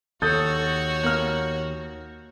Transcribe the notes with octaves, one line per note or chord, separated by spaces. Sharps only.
D#2 F#4 A4 C#5 D#6 G6 A6
A#3 F6